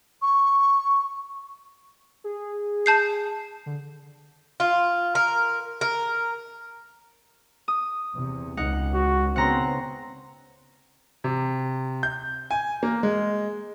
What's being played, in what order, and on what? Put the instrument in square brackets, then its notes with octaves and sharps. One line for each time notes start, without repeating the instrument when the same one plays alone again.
[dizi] C#6
[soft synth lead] G#4
[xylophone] A5 G6 C7
[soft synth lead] D3
[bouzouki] F4
A#4
A#4
[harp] D#6
[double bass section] E2 C3
[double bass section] C#2 [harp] D#4 F#5
[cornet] F#4
[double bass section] C#3 B3 [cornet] C4 [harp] F#5 A#5 C6
[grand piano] C3
G6
G#5
A#3
G#3